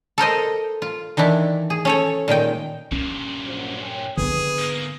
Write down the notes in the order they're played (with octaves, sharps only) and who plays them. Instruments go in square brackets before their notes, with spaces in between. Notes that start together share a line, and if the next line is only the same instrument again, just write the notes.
[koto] A4 A#4 C5 D#5
F4
D#3 E3 D4 E4
G#4
C#4 A4 C#5
A#2 D#3 G#3 G5
[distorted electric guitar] G2 A#2 [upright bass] C#4
[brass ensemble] A#1 F#3 C5
C#5 G5 G#5
[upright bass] D3 B3 [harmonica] G#4 [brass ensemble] B4
[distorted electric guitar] G#2 A#3